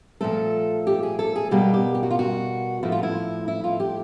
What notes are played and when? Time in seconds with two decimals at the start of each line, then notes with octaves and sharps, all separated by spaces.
0.21 A#2 F3 A3 A4
0.87 G4
1.03 G#4
1.19 A4
1.36 G#4
1.51 B2 G3 A#3 G4
1.74 G4
1.95 G4
2.03 F#4
2.10 F4
2.19 F#4
2.83 A2 F3 A3 E4
2.92 F4
3.03 E4
3.48 E4
3.64 F4
3.80 G4